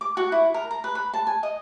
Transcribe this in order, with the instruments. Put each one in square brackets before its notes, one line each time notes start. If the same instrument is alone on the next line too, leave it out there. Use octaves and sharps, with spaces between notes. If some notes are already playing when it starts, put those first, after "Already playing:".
[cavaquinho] D6
F#4
E4
A#4
A#5
B4
B5
A5
G#5
D#5